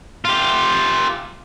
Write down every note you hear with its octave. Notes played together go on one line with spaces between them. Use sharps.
F4 G4